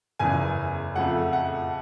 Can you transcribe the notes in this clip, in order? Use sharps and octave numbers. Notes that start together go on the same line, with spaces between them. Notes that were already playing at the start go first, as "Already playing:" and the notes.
F#1 E2 C#3 E3 G#5
F2 C#3 F3 A3 F#5
F#5